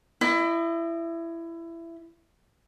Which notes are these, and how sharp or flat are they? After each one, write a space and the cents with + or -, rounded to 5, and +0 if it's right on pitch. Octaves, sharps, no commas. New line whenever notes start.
E4 +20 D#5 -20